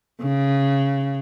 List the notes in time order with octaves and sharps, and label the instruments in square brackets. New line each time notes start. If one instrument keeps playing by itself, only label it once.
[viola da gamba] C#3